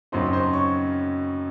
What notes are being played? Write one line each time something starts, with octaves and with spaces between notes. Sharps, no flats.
F#2 C#3 F#3 C4 D#4 C5 C6
C5 C6
C#5 C#6